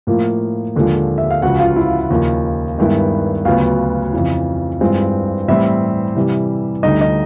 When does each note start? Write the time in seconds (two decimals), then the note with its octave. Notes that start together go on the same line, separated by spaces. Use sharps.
0.07 A2 F3 A#3
0.76 D#2 D3 F3 G#3
1.18 E5
1.31 F5
1.42 C#2 C#3 F3 F#4 F#5
1.59 F4 F5
1.76 E4 E5
2.10 D#2 C#3 F3
2.78 G2 D#3 G#3 B3 E4
3.45 D2 C#3 F#3 B3 F4 F5
4.13 F2 C#3 E3
4.81 G2 E3 G#3 C4 F4
5.48 A2 E3 G3 C4 E4 E5
6.15 C3 E3 G3
6.83 D2 D3 G3 D#4 D#5
7.01 D#4 D#5